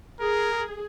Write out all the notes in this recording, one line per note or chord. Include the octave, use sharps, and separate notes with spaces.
G#4 A#4